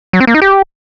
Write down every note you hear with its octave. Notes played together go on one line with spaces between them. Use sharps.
F#3
C4
A#3
D#4
G4